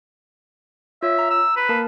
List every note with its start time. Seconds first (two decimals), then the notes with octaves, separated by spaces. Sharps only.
1.03 F4 C#5 E5
1.19 A#5
1.30 E6
1.56 B4
1.69 A#3 A#4 A5